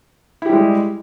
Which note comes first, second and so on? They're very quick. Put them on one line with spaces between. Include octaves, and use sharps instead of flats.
E4 G4 G3 G#3